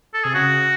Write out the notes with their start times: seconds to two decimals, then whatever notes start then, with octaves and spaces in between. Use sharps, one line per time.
0.14 A4
0.24 C3 G#4
0.34 C#3 F#4